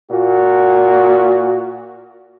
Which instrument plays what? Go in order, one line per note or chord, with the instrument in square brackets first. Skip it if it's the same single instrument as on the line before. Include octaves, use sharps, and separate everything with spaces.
[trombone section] A#2 F#4